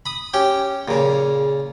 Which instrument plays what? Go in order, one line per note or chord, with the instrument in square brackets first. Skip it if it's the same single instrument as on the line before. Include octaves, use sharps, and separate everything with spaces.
[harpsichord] B5 D#6
C#4 G4 G5
[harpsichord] A#2 C#3 [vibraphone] G#4